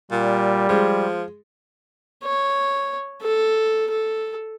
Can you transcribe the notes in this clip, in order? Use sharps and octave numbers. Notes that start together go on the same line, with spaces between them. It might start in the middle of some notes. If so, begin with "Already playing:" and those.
A#2 G3
F3 G#3
C#5
A4
A4